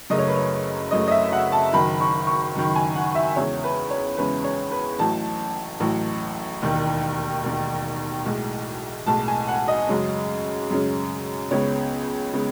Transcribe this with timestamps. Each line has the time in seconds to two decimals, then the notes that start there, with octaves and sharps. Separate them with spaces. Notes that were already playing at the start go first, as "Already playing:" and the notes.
0.10 F#1 F#2 C#3 F#3 A3 D#5
0.19 C#5
0.28 B4
0.36 C#5
0.91 F#1 F#2 C#3 F#3 A3 D#5
1.08 D#5
1.11 E5
1.32 F#5
1.52 A5
1.73 F#1 F#2 D#3 B5
2.01 C#6
2.27 C#6
2.55 F#1 F#2 D#3
2.76 G#5
2.96 F#5
3.15 E5
3.36 E2 C#3 G#3 C#4 C#5
3.64 B4
3.91 C#5
4.18 E2 C#3 G#3 C#4 B4
4.44 C#5
4.72 B4
4.99 A1 A2 F#3 A5
5.80 A1 A2 F#3
6.62 E1 D#2 D#3
7.43 E1 D#2 D#3
8.26 B1 A2 G#3
9.06 B1 A2 G#3 A5
9.28 G#5
9.48 F#5
9.68 D#5
9.88 F#2 C#3 G#3 C#4
10.70 F#2 C#3 G#3 C#4
11.51 C#2 C#3 G#3 B3 C#5
12.33 C#3 G#3 B3